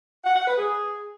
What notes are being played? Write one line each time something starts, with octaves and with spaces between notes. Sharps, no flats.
F#5
F#5
B4
G#4